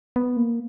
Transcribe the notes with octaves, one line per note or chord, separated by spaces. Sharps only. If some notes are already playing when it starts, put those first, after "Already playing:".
B3
A#3